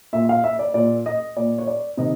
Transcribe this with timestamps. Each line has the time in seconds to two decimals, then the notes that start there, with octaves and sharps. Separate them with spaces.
0.13 A#2 E5
0.29 F5
0.44 E5
0.59 D5
0.74 A#2 D5
1.06 D#5
1.37 A#2 D5
1.58 C#5
1.67 D5
1.97 C3 D#3 D#5